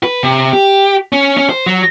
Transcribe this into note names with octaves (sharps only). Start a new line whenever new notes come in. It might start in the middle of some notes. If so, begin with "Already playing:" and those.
B4
C3
G4
C#4
C#4
C5
F#3